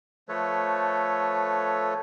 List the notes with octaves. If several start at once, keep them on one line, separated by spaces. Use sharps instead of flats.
F3 A3 A4 B4 C#5